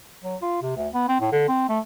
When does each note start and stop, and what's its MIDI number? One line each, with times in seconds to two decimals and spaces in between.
0.24 0.36 54
0.42 0.58 65
0.62 0.76 48
0.77 0.88 38
0.94 1.08 59
1.09 1.19 60
1.20 1.29 45
1.32 1.47 50
1.48 1.67 60
1.69 1.79 57